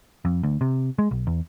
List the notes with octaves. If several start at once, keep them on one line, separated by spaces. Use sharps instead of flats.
F2
D2
C3
G#3
B1
E2